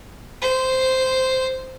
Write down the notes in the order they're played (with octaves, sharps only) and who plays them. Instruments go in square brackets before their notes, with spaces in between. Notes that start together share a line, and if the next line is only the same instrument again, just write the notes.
[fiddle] C5